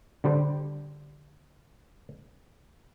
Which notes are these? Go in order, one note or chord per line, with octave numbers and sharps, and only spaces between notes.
D3 G3 C5